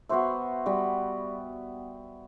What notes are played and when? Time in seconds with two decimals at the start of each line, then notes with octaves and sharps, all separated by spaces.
0.09 B3 F#4 C5 E5
0.66 G3 B3 F#4